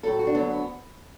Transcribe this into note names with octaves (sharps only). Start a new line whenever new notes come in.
A2 F#3 A4
F#4
D4
D2 D3 F#3 B3
B3